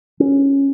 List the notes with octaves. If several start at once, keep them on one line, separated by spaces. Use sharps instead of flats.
C#4